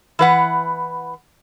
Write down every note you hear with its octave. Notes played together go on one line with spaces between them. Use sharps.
E3 B4 F#5